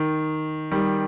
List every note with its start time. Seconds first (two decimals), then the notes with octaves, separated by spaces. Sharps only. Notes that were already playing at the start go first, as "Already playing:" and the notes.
Already playing: D#3
0.71 D#3 G3